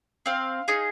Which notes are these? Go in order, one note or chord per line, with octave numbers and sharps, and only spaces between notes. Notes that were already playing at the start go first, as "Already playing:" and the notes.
C4 F5
D#4 G#4